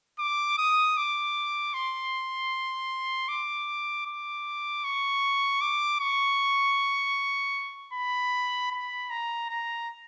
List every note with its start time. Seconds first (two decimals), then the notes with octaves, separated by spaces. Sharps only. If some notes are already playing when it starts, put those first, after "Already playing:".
0.19 D6
0.58 D#6
0.97 D6
1.74 C6
3.28 D6
4.06 D6
4.84 C#6
5.61 D6
6.00 C#6
7.93 B5
8.72 B5
9.10 A#5
9.49 A#5